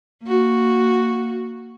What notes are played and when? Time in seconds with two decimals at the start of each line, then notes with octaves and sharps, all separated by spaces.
0.24 A#3 F#4